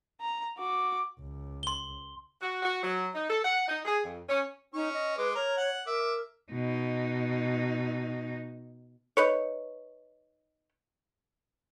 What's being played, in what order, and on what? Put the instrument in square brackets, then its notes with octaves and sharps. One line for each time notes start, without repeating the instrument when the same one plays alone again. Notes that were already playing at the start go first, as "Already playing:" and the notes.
[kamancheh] A#5
F#4 D6
[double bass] C#2
[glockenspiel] C6 G7
[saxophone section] F#4
F#4
F#3
D#4
A4
F#5
D#4
G#4
F2
C#4
[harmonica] C#4 C#6 [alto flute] D#4
[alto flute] D#5
[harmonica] G#3 D6 [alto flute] B4
[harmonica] A#4 [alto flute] C#5
[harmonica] F#5
[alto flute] A#4 [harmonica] E5 D6
[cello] B2 D#4
[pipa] D#4 B4 C#5